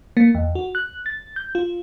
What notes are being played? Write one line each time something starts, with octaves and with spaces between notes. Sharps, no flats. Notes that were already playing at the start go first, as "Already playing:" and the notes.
A#3
E2
F#4
F#6
A6
G6
F4